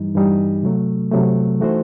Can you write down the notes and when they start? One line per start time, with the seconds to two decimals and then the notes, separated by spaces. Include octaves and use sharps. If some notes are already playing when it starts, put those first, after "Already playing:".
Already playing: G2 E3 G3 D#4
0.15 G2 E3 G3 D#4
0.63 C3 F#3 A3
1.11 C3 F#3 A3
1.60 E3 A3 D#4 F#4 C5